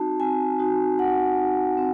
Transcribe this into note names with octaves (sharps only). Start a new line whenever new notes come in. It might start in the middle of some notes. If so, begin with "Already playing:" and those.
Already playing: C4 D#4 F#4 A5
C4 G#5
D#4 F#4
C4 F#5
D#4 F#4
C4